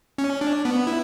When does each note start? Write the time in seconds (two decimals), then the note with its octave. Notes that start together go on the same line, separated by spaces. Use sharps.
0.18 C#4
0.41 D4
0.65 B3
0.87 E4